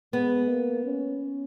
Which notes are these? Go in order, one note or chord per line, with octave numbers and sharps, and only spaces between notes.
G#3 B3
A#3
C#4